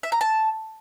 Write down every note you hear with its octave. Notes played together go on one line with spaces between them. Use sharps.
E5
A#5
A5